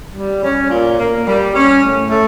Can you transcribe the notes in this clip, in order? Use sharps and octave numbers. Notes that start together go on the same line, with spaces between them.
G3
C#4
A#2
A#3
G3
C#4
A2
A3